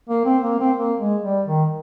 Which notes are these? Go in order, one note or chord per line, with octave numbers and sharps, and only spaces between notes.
A#3
C4
A#3
C4
A#3
G#3
G3
D#3